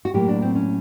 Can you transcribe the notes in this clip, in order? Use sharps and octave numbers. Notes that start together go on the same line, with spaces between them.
F#4
A2 F#3 A#3 G4
D4
C4
C#4